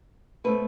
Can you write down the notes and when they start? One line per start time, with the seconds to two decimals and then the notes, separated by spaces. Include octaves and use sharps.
0.44 B2 A3 C4 B4